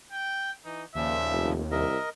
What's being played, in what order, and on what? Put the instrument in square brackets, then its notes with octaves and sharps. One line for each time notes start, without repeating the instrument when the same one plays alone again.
[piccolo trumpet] G5
[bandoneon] E3 [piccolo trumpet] D#4
[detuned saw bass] D#2 [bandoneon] A#2 C#3 F3 [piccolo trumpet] E5
[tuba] F1
[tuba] C2 [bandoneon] A#4 D#5 [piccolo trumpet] E5